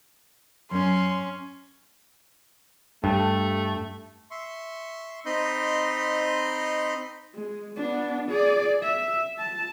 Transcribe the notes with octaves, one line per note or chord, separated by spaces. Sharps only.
F#2 C#4 C6
G2 A3
E5 C6 C#6
C4 D#4 D#5 B5 C6 G6
G#3
B3 D4
G#4 D5
E5
A5